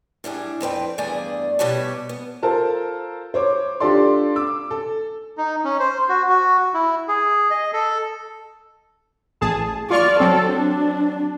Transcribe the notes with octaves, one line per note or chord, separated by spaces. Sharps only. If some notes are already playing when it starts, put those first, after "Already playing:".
A2 G3 D4 G#4
F2 C4 B4 G5
E2 G2 A3 G#4 D5
B2 G3 G4 B4 C#5 A5
B3
F4 A4 A#4 C5 A5
C5 C#5 D6
D4 F4 G4 A4 D5 C6
D6 E6
A4
D#4
C#4
C5
F#4
F#4
E4
G#4
D#5
A4
A1 G#4 A5
F4 D5 C#6 F6
F#3 C4 A4
D4